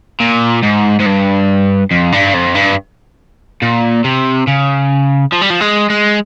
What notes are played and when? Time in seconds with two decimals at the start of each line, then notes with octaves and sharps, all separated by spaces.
0.20 A#2
0.63 G#2
1.00 G#2
1.06 G2
1.91 F2
2.12 G2
2.34 F2
2.55 G2
3.62 A#2
4.04 C3
4.47 C#3
5.32 F3
5.42 G3
5.50 F3
5.61 G#3
5.90 G#3